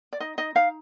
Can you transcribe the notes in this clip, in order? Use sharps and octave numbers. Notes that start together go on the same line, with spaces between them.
D5
D#4 D#5
D#4 D#5
D#4 F5